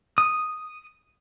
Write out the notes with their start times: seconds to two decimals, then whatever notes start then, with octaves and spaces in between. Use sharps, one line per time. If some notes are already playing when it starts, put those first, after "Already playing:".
0.18 D#6